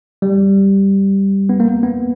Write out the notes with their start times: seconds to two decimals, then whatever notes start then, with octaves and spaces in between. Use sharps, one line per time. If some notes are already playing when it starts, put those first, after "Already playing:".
0.22 G3
1.49 B3
1.60 A#3
1.83 B3